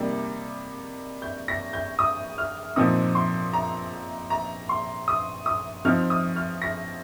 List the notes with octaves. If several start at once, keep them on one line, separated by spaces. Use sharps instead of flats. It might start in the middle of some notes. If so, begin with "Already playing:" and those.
Already playing: C3 G3 A#3 D#4
G6
A#6
G6
D#6
F6
A#2 F3 C4 D#4 D#6
C6
A#5
A#5
C6
D#6
D#6
F3 C4 D#4 F6
D#6
F6
A#6